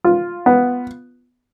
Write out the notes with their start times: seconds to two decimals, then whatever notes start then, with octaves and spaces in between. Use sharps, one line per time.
0.04 F4
0.46 B3